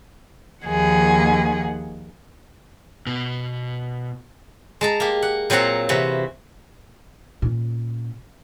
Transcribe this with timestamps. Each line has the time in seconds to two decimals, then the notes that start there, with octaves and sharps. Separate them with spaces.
0.65 D#2 D#3 F3 A#3 G#4 F#5
3.07 B2
4.81 G#3 A5 A#5
5.00 A#3 G4
5.23 F#5
5.50 A#2 F#3 C4 C5 F#5 A#5
5.89 C3 E3 F#4
7.42 A#2 C#4